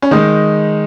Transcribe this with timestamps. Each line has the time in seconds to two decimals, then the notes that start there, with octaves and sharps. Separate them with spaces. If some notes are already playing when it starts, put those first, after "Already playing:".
0.02 C#4
0.11 D#3 G#3 D#4